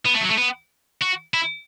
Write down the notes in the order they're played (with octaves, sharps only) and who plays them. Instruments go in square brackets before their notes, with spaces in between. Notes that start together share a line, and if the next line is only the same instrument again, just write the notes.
[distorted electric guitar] B3
A3
F#3
A3
B3
F#4
E4